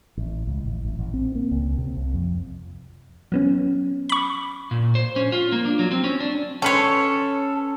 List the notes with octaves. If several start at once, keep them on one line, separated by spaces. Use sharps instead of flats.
A1
C#2
A1
A1
A1
C4
A#3
C#2
C3
C2
F2
F#3 B3 C#4
B5 C#6
A#2
C5
C#4
F4
A#3
D4
F#3
C4
C#4
D4
C#4 A4 B4 C#5 C6